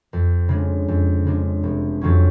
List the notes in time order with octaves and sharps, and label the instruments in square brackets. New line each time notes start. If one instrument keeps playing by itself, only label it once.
[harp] F2
C#3 G#3 D4
F2
C#3 G#3 D4
F1
F2 C#3 F#3 C#4